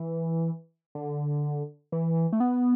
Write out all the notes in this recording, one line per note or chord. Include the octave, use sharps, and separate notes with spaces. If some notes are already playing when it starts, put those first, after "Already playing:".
Already playing: E3
D3
E3
A3
B3